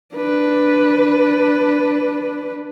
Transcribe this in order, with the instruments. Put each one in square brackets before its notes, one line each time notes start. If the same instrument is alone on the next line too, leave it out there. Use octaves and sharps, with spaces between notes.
[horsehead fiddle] D4 B4